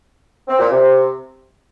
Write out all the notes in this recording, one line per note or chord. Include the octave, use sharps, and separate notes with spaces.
C4
A#2
C3